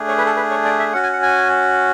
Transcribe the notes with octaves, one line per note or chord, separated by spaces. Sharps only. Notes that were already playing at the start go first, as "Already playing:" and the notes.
Already playing: A3 D4 G#4
C#5
B4
A4
B4
C#5
D5
E5
C#4 F#4 F#5
G#5
F#5
G#5